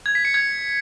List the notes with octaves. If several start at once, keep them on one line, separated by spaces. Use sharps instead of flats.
G#6
B6
C#7
G#6